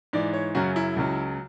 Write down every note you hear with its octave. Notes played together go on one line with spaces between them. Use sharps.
G#2 E3 D5
C#5
F#2 C#3 F#3 F#4
E4
C#2 C#3 F#3